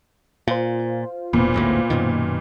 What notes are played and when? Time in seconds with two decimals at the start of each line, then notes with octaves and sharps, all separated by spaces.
0.48 A#2 F4 C5
1.33 E1 A#2 B3
1.54 G#1 D2 A2
1.90 F#2 B2 D#3